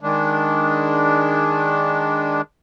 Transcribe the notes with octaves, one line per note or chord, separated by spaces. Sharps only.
D#3 G#3 D4